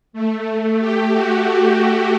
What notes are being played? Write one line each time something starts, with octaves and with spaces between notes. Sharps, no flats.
A3
G4
F#4